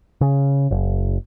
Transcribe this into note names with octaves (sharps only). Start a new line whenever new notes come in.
C#3
F#1